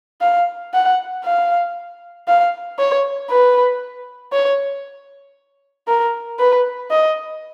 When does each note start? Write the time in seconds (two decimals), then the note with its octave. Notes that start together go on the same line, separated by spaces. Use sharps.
0.21 F5
0.74 F#5
1.24 F5
2.28 F5
2.79 C#5
3.30 B4
4.32 C#5
5.88 A#4
6.39 B4
6.91 D#5